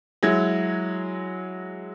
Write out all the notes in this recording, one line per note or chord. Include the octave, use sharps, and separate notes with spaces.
F#3 G#3 E4 G#6